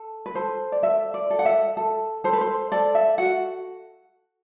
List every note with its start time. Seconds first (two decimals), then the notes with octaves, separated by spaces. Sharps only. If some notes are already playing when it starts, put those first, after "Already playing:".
Already playing: A4
0.26 B4
0.35 A4 C5
0.72 D5
0.82 A4 E5
1.14 D5
1.30 A4
1.39 F#5
1.45 E5
1.77 A4
2.24 A4 C5
2.33 B4
2.41 C5
2.72 A4 D5
2.95 E5
3.18 F#4 F#5